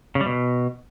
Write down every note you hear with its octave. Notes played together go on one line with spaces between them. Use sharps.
C#3
G3
B2